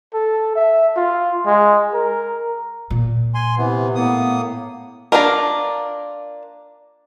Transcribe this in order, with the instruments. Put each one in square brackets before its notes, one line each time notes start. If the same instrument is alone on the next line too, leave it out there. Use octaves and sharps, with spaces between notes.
[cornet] A4
E5
F4
G#3
A#4
[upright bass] A#2
[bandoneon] G#5 C6
C3 E3 B3
[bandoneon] A2 A#3 D#6 [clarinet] B3
[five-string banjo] A#3 D4 E4 F4 A#4